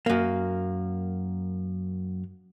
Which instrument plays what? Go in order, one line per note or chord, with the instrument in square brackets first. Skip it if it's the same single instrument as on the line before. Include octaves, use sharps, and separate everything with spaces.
[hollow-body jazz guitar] F#2 A#3